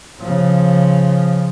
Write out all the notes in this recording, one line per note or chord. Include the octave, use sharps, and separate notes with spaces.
C#3 F3